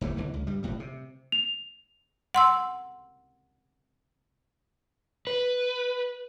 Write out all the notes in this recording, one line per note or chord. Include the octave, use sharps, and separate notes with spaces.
F#1 D#2 E3 A3
B1 D3 E3
C#2
G2 G3
F1 A2 G3
C3
F7
F#5 C6 E6
B4